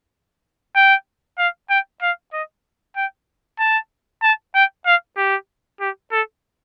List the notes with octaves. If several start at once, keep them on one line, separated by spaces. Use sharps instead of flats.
G5
F5
G5
F5
D#5
G5
A5
A5
G5
F5
G4
G4
A4